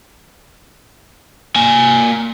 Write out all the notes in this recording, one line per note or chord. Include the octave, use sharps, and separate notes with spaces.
A#3 G#5